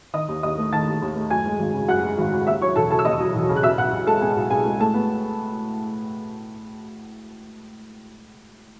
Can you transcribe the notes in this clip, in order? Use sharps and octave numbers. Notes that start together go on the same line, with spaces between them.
D#3 D#5 D#6
D#2
D#2 D#5 D#6
A3
D#3 A5 A6
D#2
D#2
A3
F#2 G#5 G#6
G#3
G#1
C#3
F#2 F#5 F#6
G#3
G#1
C#3
D#2 E5 E6
F#3 C#5 C#6
E1 A4 A5
C#3 A4 A5
E6
D#2 D#5 D#6
F#3
E1
C#3
F#6
B2 E5 E6
B1 F#5 F#6
B1
G#3 A4 A5
B2 G#4 G#5
B1
B1 G#4 G#5
G#3
A2 A4 A5
B3